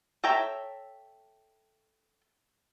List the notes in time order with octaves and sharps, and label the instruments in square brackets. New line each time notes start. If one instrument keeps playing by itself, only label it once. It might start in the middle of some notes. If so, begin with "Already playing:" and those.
[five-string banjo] A4 C#5 E5 G5 A#5